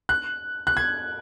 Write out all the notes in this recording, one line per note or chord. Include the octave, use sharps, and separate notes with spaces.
F#6
F#6
G#6